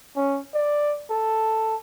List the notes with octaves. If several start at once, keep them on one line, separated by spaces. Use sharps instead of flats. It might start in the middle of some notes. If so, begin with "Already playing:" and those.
C#4
D5
A4